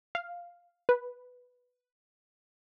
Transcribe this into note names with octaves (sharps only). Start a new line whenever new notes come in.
F5
B4